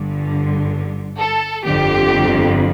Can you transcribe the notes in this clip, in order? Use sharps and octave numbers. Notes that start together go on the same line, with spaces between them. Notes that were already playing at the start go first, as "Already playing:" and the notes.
Already playing: G1 G2 D3
A4
G1 F2 D3 G4